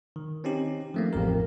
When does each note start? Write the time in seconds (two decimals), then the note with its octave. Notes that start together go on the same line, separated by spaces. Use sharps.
0.16 D#3
0.44 C4 C#4 D#4 G4
0.94 F3 A3 A#3
1.13 A1 F2 G4 A#4